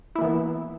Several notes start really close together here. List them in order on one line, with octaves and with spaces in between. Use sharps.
E4 A#3 E3 B3